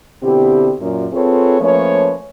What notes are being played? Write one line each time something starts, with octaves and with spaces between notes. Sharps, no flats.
B2 D3 C4 E4 G4
F#2 A#2
C4 F4 G#4 A4 B4 C#5
F3 A3 A#3 C#4 B4 C#5